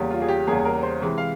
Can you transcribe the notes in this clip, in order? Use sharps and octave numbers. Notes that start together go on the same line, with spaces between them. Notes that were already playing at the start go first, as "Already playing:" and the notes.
Already playing: E2 C#3 G3 A#3
F4
G#4
G4
E2 C#3 G3 A#3 G#4
A#4
C5
C3 E3 G#3
F5